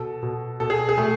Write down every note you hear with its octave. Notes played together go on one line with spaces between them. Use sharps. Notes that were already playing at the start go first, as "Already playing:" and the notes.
Already playing: B2 A4
B2
B2 A4
G#4
G#4
B2 A3